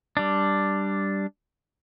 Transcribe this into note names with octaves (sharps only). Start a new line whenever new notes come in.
G3 D4